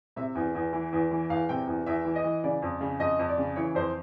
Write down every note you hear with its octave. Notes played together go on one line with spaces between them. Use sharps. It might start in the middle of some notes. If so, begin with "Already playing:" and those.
C3 E5
E2
E2
E3
E2
E3
E2 F5
C3 G5
E2
E2 E5
E3
D#5
E3
C#3 D5
F2
C#3
F2 D#5
F2
D5
C#3
E3 C#5
F2 C5